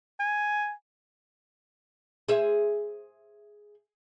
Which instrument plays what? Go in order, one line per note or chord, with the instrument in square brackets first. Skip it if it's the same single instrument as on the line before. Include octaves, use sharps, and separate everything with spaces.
[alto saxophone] G#5
[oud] G#4 C5 E5